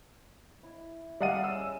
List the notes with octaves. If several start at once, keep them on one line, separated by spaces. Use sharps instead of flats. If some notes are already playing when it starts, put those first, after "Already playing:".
E4
G3 G#4 D5 D#5 F5 F#5 D#7
C#4 E6